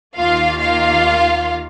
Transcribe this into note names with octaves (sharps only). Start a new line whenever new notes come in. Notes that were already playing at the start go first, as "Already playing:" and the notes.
D#2 D#3 A#3 F4 F5
F4 F5